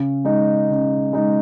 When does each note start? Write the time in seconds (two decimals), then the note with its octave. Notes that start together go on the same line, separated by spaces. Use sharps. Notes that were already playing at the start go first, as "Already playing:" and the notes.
Already playing: C#3
0.25 G#3 D#4
0.70 C#3
1.13 G#3 D#4